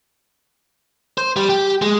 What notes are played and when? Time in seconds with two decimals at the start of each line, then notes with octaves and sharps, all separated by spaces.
1.18 C5
1.36 G3
1.49 G4
1.82 G#3